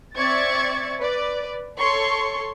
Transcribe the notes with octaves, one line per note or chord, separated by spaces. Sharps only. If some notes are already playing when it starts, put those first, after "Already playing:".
C4 D5 E5 C#6 G#6 A6
B4 D5
A4 C#5 C6 C#6